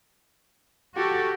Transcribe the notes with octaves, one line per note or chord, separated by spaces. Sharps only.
F#4 G4 A4